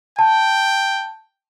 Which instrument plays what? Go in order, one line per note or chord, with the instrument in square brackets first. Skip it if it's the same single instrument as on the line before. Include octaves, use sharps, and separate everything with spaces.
[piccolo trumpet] G5 [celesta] A5